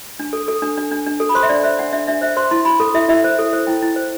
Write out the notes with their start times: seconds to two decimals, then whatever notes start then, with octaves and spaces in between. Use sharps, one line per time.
0.20 D4
0.33 A4
0.48 A4
0.62 D4
0.78 D4
0.91 D4
1.07 D4
1.20 A4
1.29 B5
1.35 C5 C6
1.43 E5
1.49 D4 D5
1.63 C5 E5
1.79 D4 F#5
1.93 D4 E5
2.08 D4 E5
2.22 C5 E5
2.37 C5 C6
2.51 E4 C6
2.65 E4 B5
2.80 A4
2.94 E4 E5
3.09 E4 E5
3.24 C5
3.39 A4
3.53 C5
3.67 E4 G5
3.82 E4
3.96 C5